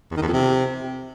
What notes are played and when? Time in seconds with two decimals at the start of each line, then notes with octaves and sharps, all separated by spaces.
0.11 E2
0.17 D#3
0.22 E2
0.28 F2
0.33 C3